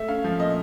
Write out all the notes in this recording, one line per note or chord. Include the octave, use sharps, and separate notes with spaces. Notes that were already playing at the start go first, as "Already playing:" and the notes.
Already playing: A3 E5
C#4 F5
F3
A#2 D#5